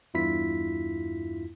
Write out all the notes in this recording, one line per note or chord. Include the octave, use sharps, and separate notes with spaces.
E2 G2 E4 F4 B6